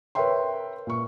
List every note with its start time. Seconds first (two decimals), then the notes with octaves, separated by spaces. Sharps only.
0.15 A#4 B4 C#5 E5 G5 C6
0.87 A#2 C#6